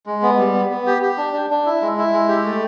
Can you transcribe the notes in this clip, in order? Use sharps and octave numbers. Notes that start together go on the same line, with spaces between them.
G#3
B3
G3
B3
B3
G4
G4
D4
D4
D4
E4
G#3
E4
G#3
G4
A3